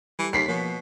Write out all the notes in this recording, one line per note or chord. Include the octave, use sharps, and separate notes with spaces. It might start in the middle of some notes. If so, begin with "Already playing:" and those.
E3 G3 A4
D#2 B6 C7
B2 F3 A#3 C#5